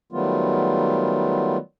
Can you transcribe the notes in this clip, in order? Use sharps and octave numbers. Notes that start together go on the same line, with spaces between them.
D#3 F#3 G3 A3 B3 F4